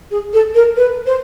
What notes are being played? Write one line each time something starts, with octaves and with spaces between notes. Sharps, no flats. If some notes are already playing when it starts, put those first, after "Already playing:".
G#4
A4
A#4
B4
C5